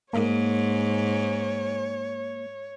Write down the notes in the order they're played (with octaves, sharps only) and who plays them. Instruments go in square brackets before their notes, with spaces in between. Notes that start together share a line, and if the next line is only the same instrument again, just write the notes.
[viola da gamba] G#2 [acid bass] A#3 [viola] C#5